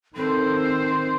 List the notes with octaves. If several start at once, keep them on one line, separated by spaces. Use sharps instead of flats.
D#3 C4 A4 C5